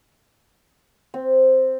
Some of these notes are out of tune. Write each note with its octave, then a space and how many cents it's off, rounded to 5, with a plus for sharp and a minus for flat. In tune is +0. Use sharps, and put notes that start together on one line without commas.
C4 +0